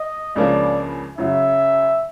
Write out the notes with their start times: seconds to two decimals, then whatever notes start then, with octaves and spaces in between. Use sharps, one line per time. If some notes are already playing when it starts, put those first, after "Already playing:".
Already playing: D#5
0.36 C#2 C#3 F3 A#3 D4 D5
1.18 F#2 C#3 F#3 E5